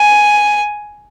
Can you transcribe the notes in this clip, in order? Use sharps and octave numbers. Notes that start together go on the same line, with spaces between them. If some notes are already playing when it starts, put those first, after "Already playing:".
Already playing: G#5